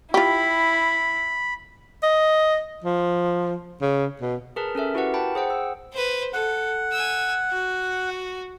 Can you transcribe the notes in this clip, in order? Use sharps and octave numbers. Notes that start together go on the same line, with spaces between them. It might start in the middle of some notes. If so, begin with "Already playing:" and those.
E4 F4 G4 B5
D#5
F3
C#3
B2
G#4 A#4 B4 A5
C#4 A4 A#4 E5
E4 F#4 G4 A#4 B4 F#5
G5 A5 B5
G#4 C5 F#5 G5
E6
B4 C5
A4 F#5
G#5 E6
F#4